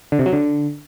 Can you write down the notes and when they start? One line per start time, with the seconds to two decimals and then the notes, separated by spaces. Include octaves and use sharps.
0.12 D3
0.19 C3
0.26 F#3
0.33 D3